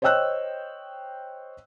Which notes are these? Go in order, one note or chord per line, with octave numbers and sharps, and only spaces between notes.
C5 C#5 D#5 G5 E6 F#6